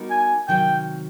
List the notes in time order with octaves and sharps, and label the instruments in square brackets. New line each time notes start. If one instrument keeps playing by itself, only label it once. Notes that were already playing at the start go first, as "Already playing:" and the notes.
Already playing: [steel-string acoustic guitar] G3 B3 D#4 F#4 A#4
[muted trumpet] G#5
[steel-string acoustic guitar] C3 D#3 F#3 [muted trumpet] G5